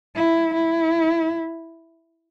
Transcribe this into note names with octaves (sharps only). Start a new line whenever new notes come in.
E4
E4